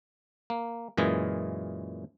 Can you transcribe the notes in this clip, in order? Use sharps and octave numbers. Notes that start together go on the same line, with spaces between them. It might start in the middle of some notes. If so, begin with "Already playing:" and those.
A#3
F#2 A#2 E3 G#3 D#5